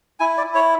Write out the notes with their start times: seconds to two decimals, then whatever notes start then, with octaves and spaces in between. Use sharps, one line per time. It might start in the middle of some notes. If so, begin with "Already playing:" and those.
0.20 E4 G#5
0.38 D5
0.46 E4
0.55 C#5